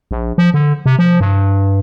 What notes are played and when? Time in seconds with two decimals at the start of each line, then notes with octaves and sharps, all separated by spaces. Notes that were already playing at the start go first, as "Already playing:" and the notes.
0.11 A#1
0.38 F3
0.54 D3
0.86 C3
0.99 F3
1.20 G2